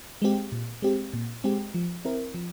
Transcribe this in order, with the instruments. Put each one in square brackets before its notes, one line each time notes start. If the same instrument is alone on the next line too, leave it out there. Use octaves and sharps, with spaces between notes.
[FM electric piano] G#3 C4 G4
A#2
G#3 C4 G4
A#2
G#3 C4 G4
F3
C4 E4 A#4
F3